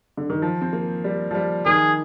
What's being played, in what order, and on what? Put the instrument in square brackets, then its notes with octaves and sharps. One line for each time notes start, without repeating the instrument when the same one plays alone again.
[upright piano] D3
D#3
F3
C4
A#3
G3
F3
G3
[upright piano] D#3 [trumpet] G#4